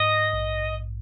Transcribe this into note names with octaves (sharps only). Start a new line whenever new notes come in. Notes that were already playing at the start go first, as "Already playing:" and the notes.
Already playing: G#2 D#5
A#1